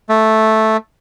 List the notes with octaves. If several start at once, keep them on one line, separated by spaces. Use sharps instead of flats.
A3